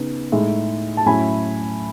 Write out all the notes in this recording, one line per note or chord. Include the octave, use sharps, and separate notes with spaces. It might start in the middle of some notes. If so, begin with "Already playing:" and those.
Already playing: C#3 B3 D#4
A2 G#3 D#4
A5
A2 F#3 C#4 E4 G#5 B5